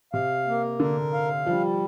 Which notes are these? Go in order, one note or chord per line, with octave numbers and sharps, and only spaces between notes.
C3 F5
A#3
D3 A#4
F5
F3 G3